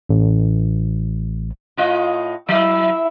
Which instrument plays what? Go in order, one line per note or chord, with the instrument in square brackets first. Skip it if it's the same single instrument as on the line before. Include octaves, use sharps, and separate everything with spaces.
[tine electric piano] A1
[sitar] A2 F4 D#5
[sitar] F#3 [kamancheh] E4 E5